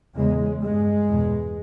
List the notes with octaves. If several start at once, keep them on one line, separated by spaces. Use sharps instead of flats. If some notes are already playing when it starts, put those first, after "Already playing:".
E2 C#3 G#3
G2 G#3
E2 B2